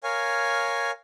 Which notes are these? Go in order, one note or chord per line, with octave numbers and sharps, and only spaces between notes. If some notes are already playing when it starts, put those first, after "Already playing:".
A#4 C#5 F5 G#5